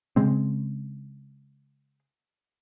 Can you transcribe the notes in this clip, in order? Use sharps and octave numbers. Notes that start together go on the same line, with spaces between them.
C#3 G#3 C4